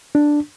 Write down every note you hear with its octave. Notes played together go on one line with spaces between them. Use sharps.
D4